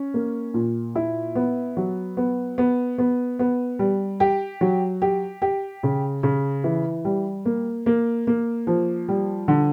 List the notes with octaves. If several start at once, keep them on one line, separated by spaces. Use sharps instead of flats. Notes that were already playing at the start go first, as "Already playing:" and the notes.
Already playing: C#4
A#3
A#2
E4
B3
F#3
B3
B3
B3
B3
G3
G4
F#3
G4
G4
C#3
C#3
E3
G3
A#3
A#3
A#3
F3
G3
D3